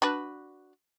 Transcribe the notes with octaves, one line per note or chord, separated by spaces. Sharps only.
D4 F#4 B4